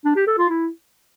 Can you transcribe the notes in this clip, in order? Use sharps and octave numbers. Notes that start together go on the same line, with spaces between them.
D4
G4
A4
F4
E4